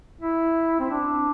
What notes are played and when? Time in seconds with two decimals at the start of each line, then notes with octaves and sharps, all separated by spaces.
0.21 E4
0.80 C4
0.91 D4